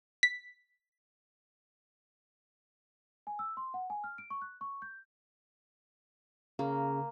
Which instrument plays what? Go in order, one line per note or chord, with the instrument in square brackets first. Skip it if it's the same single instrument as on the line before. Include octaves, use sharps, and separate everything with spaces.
[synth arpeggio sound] B6
[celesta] G#5
E6
C6
F#5
G#5
F6
D7
C#6
F#6
C#6
G6
[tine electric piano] C#3 [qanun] A#3